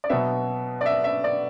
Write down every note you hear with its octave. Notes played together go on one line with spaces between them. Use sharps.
D5
B2 F#3 B3 E5
D5
E5
E5
D5